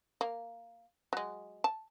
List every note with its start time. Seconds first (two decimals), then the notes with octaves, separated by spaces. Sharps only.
0.21 A#3
1.13 F#3 G#3
1.64 A5